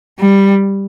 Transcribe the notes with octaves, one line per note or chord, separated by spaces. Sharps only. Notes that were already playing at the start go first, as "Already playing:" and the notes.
G3